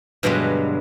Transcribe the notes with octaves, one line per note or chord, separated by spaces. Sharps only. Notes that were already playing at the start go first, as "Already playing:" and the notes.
G2 B2 D3 F#3 G#3